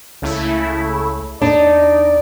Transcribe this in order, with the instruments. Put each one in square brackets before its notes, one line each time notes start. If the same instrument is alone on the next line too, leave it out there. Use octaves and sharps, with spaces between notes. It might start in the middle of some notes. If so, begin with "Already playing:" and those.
[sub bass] C#2 [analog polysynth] C#3 A3 E4
[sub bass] E2 [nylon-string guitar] D4 [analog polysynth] D#4 [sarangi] D5